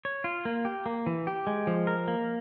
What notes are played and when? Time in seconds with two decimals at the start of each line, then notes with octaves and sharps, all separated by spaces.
0.05 C#5
0.24 F4
0.45 A#3
0.65 G4
0.86 A#3
1.07 E3
1.27 G4
1.47 G#3
1.67 F3
1.87 A#4
2.08 A#3